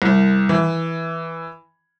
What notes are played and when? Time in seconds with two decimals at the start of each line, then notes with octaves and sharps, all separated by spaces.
0.02 C2
0.49 E3